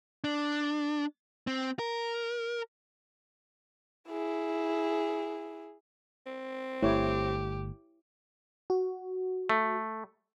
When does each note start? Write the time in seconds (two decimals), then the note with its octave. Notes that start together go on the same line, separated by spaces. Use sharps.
0.24 D4
1.47 C4
1.79 A#4
4.09 E4 G#4
6.26 C4
6.82 G1 A3 E4 G4 C#5
8.70 F#4
9.49 A3